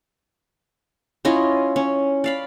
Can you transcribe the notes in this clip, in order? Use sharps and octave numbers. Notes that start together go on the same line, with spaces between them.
C#4 E4 F4 D#5
C#4
D5 F5 B5